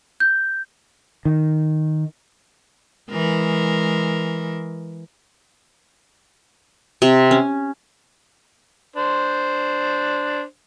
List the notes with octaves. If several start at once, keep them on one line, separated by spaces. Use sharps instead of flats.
G6
D#3
E3 G#3 A#4
C3
C#4
D4 C5